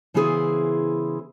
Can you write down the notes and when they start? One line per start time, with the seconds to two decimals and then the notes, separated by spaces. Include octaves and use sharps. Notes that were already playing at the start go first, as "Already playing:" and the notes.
0.14 C#3 E3 B3 E4 G#4 C5